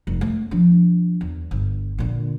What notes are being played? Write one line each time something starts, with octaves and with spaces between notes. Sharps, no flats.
F1
A3
F3 D4
E2
G1
A#2 D3